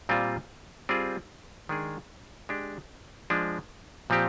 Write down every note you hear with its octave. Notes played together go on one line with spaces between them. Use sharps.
A#2 G3 C4 F4
G3 C4 F4 G#4
D#3 G#3 D4 G#4
G#3 D4 G4
F3 G#3 D4
A#2 F3 C4 G4